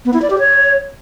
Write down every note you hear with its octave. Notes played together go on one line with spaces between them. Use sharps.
B3
E4
D5
G4
C#5